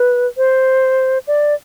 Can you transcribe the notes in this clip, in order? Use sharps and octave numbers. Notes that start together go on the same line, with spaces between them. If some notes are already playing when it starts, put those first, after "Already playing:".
Already playing: B4
C5
D5